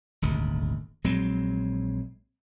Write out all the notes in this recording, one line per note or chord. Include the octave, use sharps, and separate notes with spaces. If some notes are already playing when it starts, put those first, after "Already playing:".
D#1 G#1 D2
A#1 F#3 G#3 C4